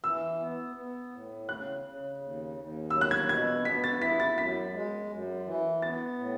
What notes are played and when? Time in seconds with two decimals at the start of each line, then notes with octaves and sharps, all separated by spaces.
0.04 E3 E6
0.40 B3
0.76 B3
1.12 A2
1.49 C#3 F#6
1.85 C#3
2.21 D#2
2.57 D#2
2.90 F#3 E6
3.01 F#6
3.11 G#6
3.29 B2 G#6
3.65 B3 B6
3.84 A6
4.01 E4 B6
4.20 A6
4.38 F#2 B6
4.73 G#3
5.11 F#2
5.46 E3
5.82 B3 A6
6.18 A2